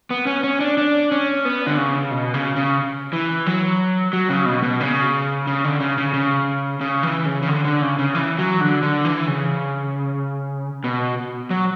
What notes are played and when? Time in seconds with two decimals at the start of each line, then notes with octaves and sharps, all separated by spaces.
0.10 B3
0.27 C#4
0.44 C#4
0.60 D4
0.78 D4
1.12 C#4
1.45 B3
1.67 D3
1.77 C#3
2.11 B2
2.34 C#3
2.56 C#3
3.13 E3
3.46 F#3
4.13 F#3
4.29 C#3
4.46 B2
4.63 B2
4.80 C#3
5.47 C#3
5.64 D3
5.80 C#3
5.98 C#3
6.13 C#3
6.81 C#3
7.03 E3
7.26 C#3
7.42 C#3
7.48 D3
7.64 D3
7.82 C#3
7.99 C#3
8.15 E3
8.38 F#3
8.61 D3
8.83 D3
9.05 E3
9.28 C#3
10.84 B2
11.50 F#3